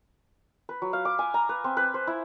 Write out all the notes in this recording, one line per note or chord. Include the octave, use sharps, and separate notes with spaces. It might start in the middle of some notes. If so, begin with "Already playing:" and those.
B4
F#3
F5
D6
G#5
A#5
B4
C4
B4
C5
E4